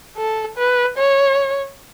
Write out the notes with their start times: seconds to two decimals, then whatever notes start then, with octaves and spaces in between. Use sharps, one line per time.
0.17 A4
0.57 B4
0.98 C#5